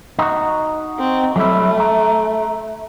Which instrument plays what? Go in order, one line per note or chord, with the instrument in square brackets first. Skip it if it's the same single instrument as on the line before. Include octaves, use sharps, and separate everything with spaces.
[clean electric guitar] D#4 F#4
[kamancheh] C4
[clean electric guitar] F#3 G3 E4 [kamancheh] A3
[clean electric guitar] E5 A#5